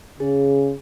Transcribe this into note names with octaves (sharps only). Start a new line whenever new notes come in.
C#3 G#4